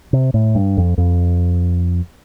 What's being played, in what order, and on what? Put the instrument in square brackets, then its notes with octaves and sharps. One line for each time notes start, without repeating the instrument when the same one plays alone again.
[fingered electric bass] C3
A2
G2
F2
F2